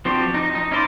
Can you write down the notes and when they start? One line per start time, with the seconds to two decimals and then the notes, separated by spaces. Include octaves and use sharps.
0.05 F3 C4 D4 F#4 G4
0.34 D#4
0.55 D#4
0.71 C#4 D#4 E4 C5 D5